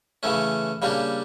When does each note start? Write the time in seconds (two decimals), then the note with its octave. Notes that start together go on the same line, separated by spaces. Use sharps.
0.23 C#3 E3 A3 C#4
0.82 C#3 G3 A#3 D4 G4